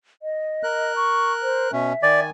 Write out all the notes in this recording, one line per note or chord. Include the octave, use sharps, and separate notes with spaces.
D#5
A#4 F#6
C#6
C5
B2 C#4 E5
D#3 D5 G#5